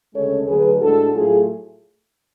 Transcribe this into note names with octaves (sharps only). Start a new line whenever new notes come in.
D2 C#3 G#3 C#4 A4 C#5
D2 D3 F#3 G#4 B4
A2 G#3 D4 F#4 A4
A2 F#3 A3 F4 G#4